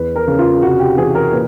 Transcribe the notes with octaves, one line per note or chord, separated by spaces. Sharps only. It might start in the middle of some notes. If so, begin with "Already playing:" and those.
Already playing: E2 B4
A#4
C#3
F4
C3 F#4
G4
E3 G#4
A#4
A#2 B4